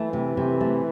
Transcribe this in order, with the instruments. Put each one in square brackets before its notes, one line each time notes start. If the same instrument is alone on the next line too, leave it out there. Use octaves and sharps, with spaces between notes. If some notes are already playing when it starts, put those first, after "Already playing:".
Already playing: [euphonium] E3 [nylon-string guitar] A3
[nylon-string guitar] C3
C3
A3